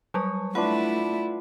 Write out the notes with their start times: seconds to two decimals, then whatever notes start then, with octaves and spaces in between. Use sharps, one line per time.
0.14 F#3 G3 C#5 D#6
0.55 A3 D4 E4 F4 B4 F#5